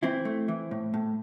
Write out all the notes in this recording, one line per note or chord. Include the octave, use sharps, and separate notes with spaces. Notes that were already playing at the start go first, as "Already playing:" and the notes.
E3 C4 E4
A3
E3
A2
A2